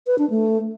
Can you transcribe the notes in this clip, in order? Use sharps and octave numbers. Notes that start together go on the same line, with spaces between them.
B4
D4
A3